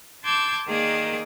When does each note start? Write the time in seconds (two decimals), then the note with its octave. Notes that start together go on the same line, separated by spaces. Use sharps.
0.24 A5 C6 D6 E6 G6 G#6
0.66 D#3 A#3 G#4 D5 D#6